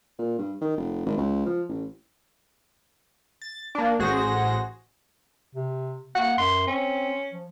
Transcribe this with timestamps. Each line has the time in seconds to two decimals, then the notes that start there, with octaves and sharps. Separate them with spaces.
0.19 A#2
0.38 G2
0.61 D#3
0.77 F1
1.06 G#1
1.17 C#2
1.46 F3
1.69 A1
3.42 A6
3.75 A#3 D4
3.99 A1 F#4 G#4 C5 A#6
5.55 C3
6.15 A#3 F#5
6.38 F#2 C6
6.67 C4 C#4
7.32 F3